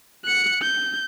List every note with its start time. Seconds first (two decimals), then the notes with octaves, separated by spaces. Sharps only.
0.25 F#6 C#7
0.62 G6